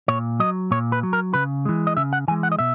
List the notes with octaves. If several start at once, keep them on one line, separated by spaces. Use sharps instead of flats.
A#2 C#5
F#3 D#5
A#2 C#5
B4
F#3
A#4
C#3 B4
E3 G#3
D#5
C#3 E5
F#5
E3 G#3 G#5
F#5
D#5
B2 E5